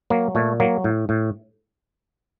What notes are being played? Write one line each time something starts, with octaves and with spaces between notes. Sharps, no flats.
F#3 A#3
A#2 A3
F#3 A#3
A2
A2